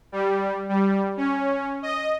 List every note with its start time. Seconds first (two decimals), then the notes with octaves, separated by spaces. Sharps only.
0.12 G3
0.69 G3
1.17 C#4
1.82 D#5